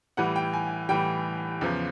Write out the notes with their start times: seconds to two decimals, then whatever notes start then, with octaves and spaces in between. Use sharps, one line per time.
0.17 A2 E3 G3 F#5
0.36 G5
0.53 G#5
0.89 A2 E3 G3 G5
1.61 E2 C#3 F3